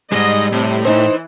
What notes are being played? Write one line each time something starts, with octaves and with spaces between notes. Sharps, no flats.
G#2 G3 G#3 D#5
A2 C3
E3 D#4 C5